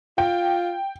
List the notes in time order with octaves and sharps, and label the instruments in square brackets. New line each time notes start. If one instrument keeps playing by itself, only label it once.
[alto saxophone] F4 [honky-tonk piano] G5